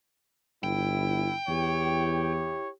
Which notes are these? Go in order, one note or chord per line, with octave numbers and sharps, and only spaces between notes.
G1 E4 G5
E2 E4 G4 C#5